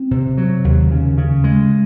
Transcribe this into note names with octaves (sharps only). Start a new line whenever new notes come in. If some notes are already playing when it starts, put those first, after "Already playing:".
Already playing: C4
C3
F#3
D#2
C#3
C#3
G#3